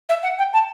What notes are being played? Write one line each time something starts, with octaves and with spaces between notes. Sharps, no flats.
E5
F#5
G5
A5